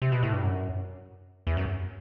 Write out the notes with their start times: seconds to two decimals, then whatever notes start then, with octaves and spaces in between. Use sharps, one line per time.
0.02 C3
0.12 B2
0.23 A2
0.33 G2
0.43 F#2
1.47 E2
1.57 F#2